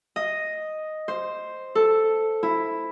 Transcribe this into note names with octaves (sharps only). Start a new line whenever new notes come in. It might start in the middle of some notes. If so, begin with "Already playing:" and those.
D#5
C5
A4
E4